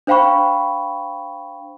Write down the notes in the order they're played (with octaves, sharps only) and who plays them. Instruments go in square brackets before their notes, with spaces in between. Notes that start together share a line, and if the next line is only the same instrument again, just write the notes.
[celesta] D4 C5 F5 G5 B5 C#6